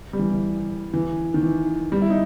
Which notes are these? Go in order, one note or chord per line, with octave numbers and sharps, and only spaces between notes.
G3
E3
E3
E3
D#3
E3
G3
E4
D#4